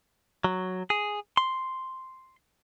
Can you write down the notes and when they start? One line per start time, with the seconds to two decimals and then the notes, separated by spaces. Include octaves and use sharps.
0.44 F#3
0.90 G#4
1.37 C6